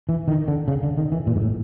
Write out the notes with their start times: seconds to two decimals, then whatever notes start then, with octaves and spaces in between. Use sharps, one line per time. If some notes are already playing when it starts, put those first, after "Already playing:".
0.09 E3
0.28 D#3
0.48 D3
0.68 C#3
0.83 D3
0.98 D#3
1.12 E3
1.27 A#2
1.36 G#2
1.42 A2